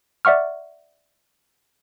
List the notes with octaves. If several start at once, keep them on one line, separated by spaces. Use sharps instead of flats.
D5 E5 F#5 C#6 F6